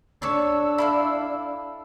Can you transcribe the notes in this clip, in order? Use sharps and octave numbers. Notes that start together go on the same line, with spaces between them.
D4 A4 C#5 A5 E6
E4 A4 F5